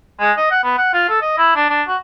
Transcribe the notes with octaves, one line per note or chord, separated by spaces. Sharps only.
G#3
D#5
F#5
B3
F#5
F4
A4
D#5
E4
D4
D4
F#4